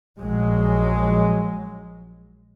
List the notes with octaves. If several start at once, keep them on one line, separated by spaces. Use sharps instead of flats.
A#1 F#3 G#3